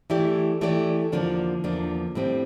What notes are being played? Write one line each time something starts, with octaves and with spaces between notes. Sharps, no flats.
E3 A3 E4 G4 D5
E3 A3 E4 G4 D5
E2 D3 F3 A#3 D4
E2 D3 F3 A#3 D4
A2 G3 C4